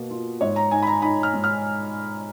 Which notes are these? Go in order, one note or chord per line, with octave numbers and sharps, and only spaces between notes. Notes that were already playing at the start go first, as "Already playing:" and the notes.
Already playing: B2 A#3
F4
G#2 C#5
A#5
D#4 G#5
B5
A#5
D#4 B5
F6
G#2
F6